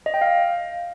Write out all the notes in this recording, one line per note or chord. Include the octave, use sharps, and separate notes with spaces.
D#5
G5
F5